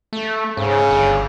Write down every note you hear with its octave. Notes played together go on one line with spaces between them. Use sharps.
A3
G#2 C#3
G1